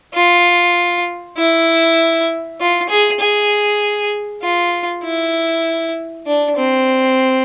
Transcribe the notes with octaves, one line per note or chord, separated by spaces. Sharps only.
F4
E4
F4
G#4
G#4
F4
E4
D4
C4